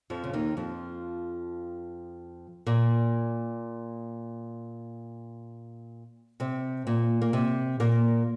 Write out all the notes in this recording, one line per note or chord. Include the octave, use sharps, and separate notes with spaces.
F2 F3
C#3
D#2 D#3
F2 F3
A#2 A#3
C3 C4
A#2 A#3
A#3
C3 C4
A#2 A#3